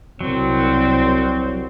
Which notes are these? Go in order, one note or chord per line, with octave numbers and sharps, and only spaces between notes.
C2 F#3 C4